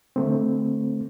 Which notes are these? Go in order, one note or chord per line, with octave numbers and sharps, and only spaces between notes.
D3 A3 C4